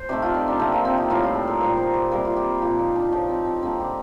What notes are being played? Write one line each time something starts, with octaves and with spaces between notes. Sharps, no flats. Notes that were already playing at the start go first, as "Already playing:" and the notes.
Already playing: C5
C3 D#3 A3 D5
F4
D#4
D4
C3 F3 A#3 C4
A#3
C4
D#4
A2 G3 A#3 F4
F4
A4
A#4
A#2 G3 A#3 C5
C5
G4
C3 G3 A#3 A#4
F4
G4
A#2 F3 A#3 G4
D#4
D4
A2 F3 A3 D#4
C4
C4
D3 G3 A#3 C4
G4